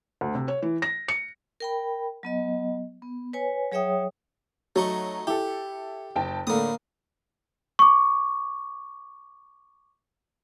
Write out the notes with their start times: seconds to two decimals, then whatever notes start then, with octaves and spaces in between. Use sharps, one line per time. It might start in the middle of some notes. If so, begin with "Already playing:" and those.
0.21 D2
0.35 C3
0.48 C#5
0.62 E3
0.82 A#6
1.08 C#7
1.60 A#4 G5 B5
2.23 F#3 B3 D#5
3.02 B3
3.33 B4 C#5 G#5
3.72 F#3 G#4 C#5 E5 G5 D#6
4.76 F#3 A3 D#4 C#6
5.27 E4 G4 A4
6.16 F#1 G5 A5
6.47 A2 D3 A#3 D#6
7.79 C#6 D6